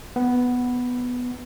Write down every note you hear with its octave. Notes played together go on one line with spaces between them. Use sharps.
B3